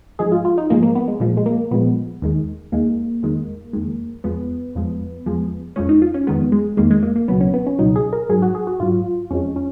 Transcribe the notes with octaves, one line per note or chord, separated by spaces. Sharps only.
G#2 F3 G#3 G#4
F4
F4
D#4
G#2 F3 G#3 A#3
A#3
B3
G#3
A#2 F3 G#3
G#3
A#3
A#2 F3 G#3 B3
D#2 D#3 G#3
D#2 D#3 G#3 A#3
F2 D#3 G#3
F2 D#3 G#3
F2 F3 G#3 B3
F2 F3 G#3
F2 F3 G#3
F2 F3 G#3 C#4
D#4
F4
C#4
F2 D#3 G#3 B3
G#3
F2 D#3 G#3 A#3
G#3
A#3
A#3
C#2 B2 F#3 B3
C#4
B3
C#4
C#2 B2 F#3 D#4
G#4
A#4
G#2 F#3 G#4
F#4
G#4
F#4
G#2 F#3 F4
F2 F3 G#3 C#4
C#4